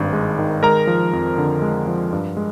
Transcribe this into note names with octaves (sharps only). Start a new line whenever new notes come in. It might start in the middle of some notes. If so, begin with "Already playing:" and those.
Already playing: G#1 G2 D#3
G#3
D#3
G#3 A#4 A#5
F3
F2
D3
G#3
F3
G2
G#3